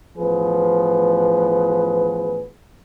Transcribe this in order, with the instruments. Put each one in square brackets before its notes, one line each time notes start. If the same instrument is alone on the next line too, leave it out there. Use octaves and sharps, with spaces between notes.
[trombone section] A1 F3 B3 G#4 B4